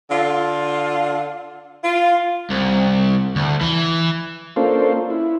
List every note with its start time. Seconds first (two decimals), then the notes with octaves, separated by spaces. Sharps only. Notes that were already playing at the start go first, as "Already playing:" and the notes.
0.11 D3 F4
1.84 F4
2.51 C2
3.36 D2
3.61 E3
4.56 A#3 C#4 D4 F4 A4 C5
5.10 E4